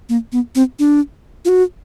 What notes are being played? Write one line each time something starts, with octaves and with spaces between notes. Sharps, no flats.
A#3
B3
C4
D4
F4
F#4